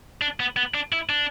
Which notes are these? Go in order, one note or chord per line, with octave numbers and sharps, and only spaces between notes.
D4
B3
B3
D4
E4
D4